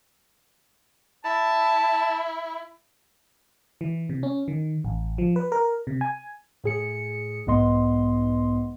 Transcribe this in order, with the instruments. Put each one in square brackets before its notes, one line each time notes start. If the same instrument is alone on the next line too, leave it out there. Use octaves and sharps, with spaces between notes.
[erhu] E4 [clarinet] A5
[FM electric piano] E3
C3
C#4
D#3
A1
F3
B4
A#4
C3
G#5
[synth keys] A2 G#4 C#7
B1 G#2 B3 D#5 C6